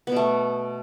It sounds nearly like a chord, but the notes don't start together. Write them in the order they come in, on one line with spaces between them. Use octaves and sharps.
B3 B2 A3